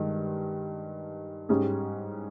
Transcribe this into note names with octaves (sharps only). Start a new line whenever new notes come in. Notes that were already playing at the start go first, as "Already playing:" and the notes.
Already playing: G2 D#3 G#3
G#2 G3 C#4 G#4